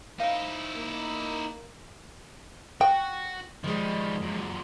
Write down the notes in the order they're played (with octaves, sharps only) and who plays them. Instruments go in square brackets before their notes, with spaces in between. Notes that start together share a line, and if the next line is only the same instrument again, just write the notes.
[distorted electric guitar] D#4 E4 [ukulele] A#4 C5 F5
[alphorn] A#3
[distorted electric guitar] F#4 [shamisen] G5
[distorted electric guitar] D#3 G3 [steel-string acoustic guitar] F3 G#3
[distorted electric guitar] F#2 A#2